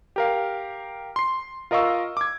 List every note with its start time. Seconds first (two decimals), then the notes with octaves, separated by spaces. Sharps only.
0.16 G4 A#4 F5
1.16 C6 C7
1.71 F4 A#4 D#5 F5 C#6 E6
2.17 D6 G#6